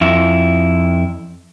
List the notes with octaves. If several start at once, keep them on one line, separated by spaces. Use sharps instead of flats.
F2 E4